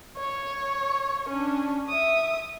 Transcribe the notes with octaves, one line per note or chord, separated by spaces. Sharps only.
C#5
C#4 D4
E5 D#6